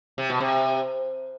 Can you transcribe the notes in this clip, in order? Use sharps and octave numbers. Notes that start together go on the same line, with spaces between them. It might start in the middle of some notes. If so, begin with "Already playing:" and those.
C3
B2
C3